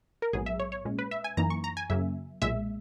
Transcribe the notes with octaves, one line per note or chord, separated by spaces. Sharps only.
A#4
A#1 G#2 F#3 B3 G#4
E5
C#5
C#5
A#2 G#3 C#4
B4
E5
G#5
F#2 E3 A#3 D#4 A#5
C#6
A#5
G#5
F#2 C#3 F#3 A#3 E5
B1 A#2 G#3 E5